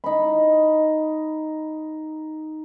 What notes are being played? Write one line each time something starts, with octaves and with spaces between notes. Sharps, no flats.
D#4 B5